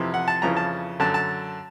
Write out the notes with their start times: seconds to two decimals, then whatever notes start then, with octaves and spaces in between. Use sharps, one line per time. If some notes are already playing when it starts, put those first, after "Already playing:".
Already playing: F2 C3 E3
0.14 F#5
0.28 A5
0.42 F2 C#3 E3 A#5
0.57 A5
1.00 F#2 D3 A5
1.14 A5